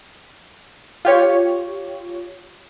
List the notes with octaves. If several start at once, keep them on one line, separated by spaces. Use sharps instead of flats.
F4 G4 C#5